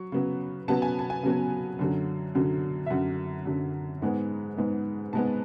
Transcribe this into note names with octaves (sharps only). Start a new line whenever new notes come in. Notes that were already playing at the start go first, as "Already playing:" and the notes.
Already playing: F#3 C#6
C#3 F#3 B3
C#3 F#3 B3 A5
G#5
A5
G#5
C#3 F#3 B3
F#2 D3 F#3
F#2 D3 F#3
E5
F#2 D3 F#3 F#5
F#2 D3 F#3
G#2 G#3 B3 F#5
G#2 G#3 B3
G#2 G#3 B3 A5